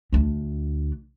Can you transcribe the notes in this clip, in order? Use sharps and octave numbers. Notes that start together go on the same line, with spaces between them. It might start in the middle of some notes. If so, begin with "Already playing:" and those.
D2 D4